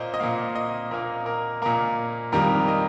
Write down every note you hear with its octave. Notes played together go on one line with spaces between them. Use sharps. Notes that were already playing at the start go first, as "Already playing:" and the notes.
Already playing: A#2 A#3 C5 D#5
D#5
A#2 A#3 F5
D#5
A#2 A#3 A#4
A#4
A#2 A#3 A#4
F2 D#3 G3 A#3 A#4
D#5